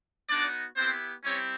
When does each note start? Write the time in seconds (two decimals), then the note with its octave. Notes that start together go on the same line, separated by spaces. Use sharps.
0.29 B3 D4 D#4 F#4 D5
0.76 B3 C4 E4 G4 C5
1.23 G3 C4 C#4 E4 G4 C#5